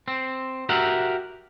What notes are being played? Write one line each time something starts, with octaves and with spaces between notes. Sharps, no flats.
C4
F#4 G4 A#4 E5 F#5